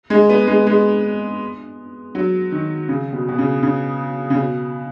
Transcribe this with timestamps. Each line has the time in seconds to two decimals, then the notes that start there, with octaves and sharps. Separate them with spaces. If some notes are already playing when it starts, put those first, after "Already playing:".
0.10 G#3
0.29 B3
0.47 G#3
0.67 G#3
2.15 F#3
2.51 D#3
2.88 C#3
3.12 B2
3.28 B2
3.38 C#3
3.63 C#3
4.30 C#3
4.36 B2